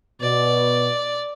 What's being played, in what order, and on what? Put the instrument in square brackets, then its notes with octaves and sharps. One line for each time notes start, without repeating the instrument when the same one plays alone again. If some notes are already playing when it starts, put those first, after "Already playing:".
[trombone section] B2 [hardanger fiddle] D5